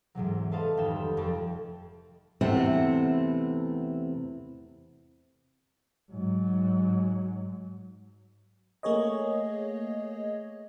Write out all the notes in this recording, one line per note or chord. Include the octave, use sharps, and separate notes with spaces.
E2 G#2 C3 F#3
A4 B4 C5 D#5 F5 A5
F1 D#3 G3 G5 E7
F2 A6
E2 C3 A3 C4 E4 F#5
G#2 F#3
A3 A#3 G#4 C#5 D#5